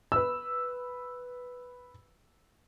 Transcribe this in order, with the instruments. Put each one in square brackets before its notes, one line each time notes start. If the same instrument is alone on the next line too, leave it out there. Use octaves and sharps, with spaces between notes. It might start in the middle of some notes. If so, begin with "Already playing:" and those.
[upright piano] B4 E6